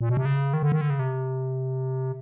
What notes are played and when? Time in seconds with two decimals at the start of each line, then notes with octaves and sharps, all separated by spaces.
0.01 A#2
0.09 B2
0.17 C3
0.25 C#3
0.53 D#3
0.63 D3
0.72 D#3
0.81 D3
0.90 C#3
0.99 C3